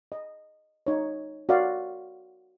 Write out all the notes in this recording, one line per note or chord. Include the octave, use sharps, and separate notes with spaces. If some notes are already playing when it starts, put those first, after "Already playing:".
D#5
D#4 C#5
F#4 A#4 D5 F5